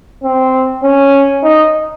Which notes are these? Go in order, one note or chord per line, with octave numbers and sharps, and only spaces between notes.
C4
C#4
D#4